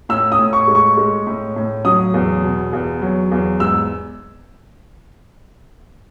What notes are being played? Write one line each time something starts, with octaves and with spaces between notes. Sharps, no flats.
A2 E6
D#6
A2
C#6
G#3
C#6
G#3
A2
A2
F#3 D#6
E2
B2
E2
F#3
E2
G#2 E6